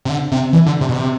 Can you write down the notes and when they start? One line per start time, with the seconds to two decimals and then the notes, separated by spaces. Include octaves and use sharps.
0.05 C3
0.10 D3
0.32 C3
0.53 E3
0.66 D3
0.81 C3
0.89 B2
0.95 C3